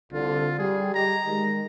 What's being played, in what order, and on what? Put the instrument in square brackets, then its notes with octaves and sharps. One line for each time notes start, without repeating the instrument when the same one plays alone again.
[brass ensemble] C2 D3 [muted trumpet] F4
[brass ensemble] G3 [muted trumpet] G#4
[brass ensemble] G4 D#5 [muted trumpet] A#5
[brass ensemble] D#3 G#3